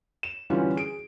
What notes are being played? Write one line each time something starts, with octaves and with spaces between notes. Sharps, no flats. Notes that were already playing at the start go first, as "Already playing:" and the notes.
E7
D3 E3 G3 C#4 F4 F#4
G#4 D7